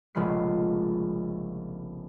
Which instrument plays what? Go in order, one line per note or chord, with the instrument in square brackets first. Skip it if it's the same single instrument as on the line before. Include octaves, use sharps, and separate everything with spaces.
[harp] F1 A#1 C#3 G#3 B5 C7